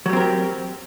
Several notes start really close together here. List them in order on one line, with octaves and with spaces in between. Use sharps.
F#3 G3 C4 A#4 G4